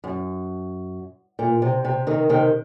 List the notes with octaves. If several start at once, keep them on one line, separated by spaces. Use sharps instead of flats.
F#2
A#2
C3
C3
C3 D#3
C3 D#3